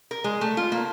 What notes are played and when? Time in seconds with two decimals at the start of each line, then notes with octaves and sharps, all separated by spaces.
0.11 A#4
0.24 G#3
0.41 A3
0.57 F4
0.72 A#3